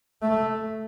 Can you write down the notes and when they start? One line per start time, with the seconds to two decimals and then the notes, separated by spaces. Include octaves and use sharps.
0.22 A3